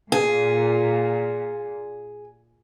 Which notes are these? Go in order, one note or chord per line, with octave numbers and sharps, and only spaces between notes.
A#2 G#4